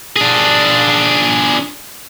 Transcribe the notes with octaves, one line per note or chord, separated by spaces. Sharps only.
D4 G#4